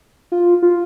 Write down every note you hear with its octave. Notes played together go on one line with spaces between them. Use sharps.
F4
F4